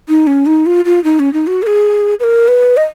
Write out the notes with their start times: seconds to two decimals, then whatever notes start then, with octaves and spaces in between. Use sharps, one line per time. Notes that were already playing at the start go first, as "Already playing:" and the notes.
0.09 D#4
0.27 C#4
0.46 D#4
0.66 F4
0.85 F4
1.04 D#4
1.19 C#4
1.33 D#4
1.47 F#4
1.63 A#4
1.67 G#4
2.20 B4
2.24 A#4
2.48 B4
2.77 D#5